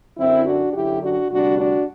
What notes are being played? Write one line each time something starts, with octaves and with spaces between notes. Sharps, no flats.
F#2 D3 F#3 C4 E4
D4 F#4
F#2 D3 F#3 E4 G4
D4 F#4
D2 C3 G3 D4 F#4
D4 F#4